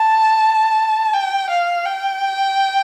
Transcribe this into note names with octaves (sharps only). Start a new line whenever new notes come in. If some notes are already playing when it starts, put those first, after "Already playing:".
Already playing: A5
G5
F5
G5